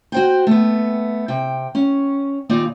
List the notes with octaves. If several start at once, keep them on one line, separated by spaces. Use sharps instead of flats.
F#4 C5 G5
A3 B3
C3 G5
C#4
D#2 A#2 D#4 D5 D#5